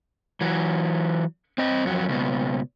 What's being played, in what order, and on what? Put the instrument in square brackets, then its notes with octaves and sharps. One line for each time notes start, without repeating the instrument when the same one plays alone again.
[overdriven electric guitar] E3 F#3
C4 D#5
F2 F#3
C#2 B2